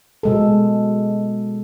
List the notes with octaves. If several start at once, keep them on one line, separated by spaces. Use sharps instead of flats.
B2 G#3 A4